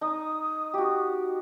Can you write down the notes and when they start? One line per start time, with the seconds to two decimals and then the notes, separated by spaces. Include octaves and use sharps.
0.01 D#4 D#6
0.74 F#4 G4